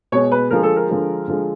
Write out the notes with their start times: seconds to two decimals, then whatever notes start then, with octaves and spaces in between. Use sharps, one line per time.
0.12 B2 G#3 C#5
0.32 B4
0.51 D3 F3 G#3 A#4
0.63 A4
0.76 A#4
0.89 D3 F3 G#3
1.28 D3 F3 G#3